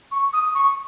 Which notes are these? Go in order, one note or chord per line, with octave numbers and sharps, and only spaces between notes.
C#6
D#6
C#6